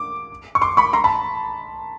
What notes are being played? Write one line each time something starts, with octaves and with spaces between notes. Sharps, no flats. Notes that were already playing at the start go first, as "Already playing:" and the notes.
Already playing: D6
C#6
C6 D6
B5 C#6
A#5 C6
A5 B5